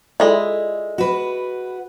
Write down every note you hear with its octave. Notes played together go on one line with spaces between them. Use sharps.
G#3 E4 F4 A4 D5
F#4 B4